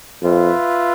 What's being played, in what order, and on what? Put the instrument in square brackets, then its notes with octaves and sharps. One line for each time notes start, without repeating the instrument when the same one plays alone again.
[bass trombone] F2 [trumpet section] F4 B4 E5